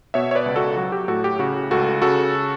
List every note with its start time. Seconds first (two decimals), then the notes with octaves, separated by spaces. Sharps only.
0.14 B2 C#5 E5
0.31 C#5
0.35 B4 D5
0.46 C#2
0.56 F#4 A4
0.77 F#3 F#4
0.92 G4
1.08 A2 F#4 A4
1.24 G4
1.39 C#3 F#4
1.71 C#2 F#4 A4
2.02 C#3 F#4 A4